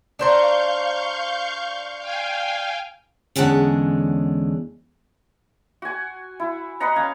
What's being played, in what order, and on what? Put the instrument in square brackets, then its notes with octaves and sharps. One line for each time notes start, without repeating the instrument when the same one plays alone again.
[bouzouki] D4 C5 A#5 [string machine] F5 C#6 G6
[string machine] F5 G5 G#5
[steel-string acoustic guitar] E2 D3 G#3 C#4 F#5 A5
[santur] F#4 G#5
E4
B4 D#5 F#5 A#5
C#4 F5 G#5